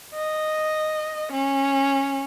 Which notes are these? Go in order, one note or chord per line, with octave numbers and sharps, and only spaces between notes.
D#5
C#4